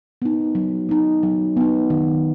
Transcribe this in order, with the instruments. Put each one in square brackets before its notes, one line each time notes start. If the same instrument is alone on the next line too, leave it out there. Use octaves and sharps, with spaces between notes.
[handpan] B3 D#4
F#3
B3 D#4
F#3
B3 D#4
D#3